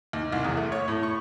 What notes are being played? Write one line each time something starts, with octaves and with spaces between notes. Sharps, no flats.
D#2
C2
E2
A3
C#5
A2
C#6